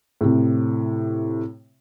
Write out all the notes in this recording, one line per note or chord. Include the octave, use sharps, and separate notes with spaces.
A2 C3